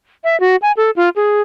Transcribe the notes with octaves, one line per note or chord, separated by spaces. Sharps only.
E5
F#4
G#5
A4
F4
G#4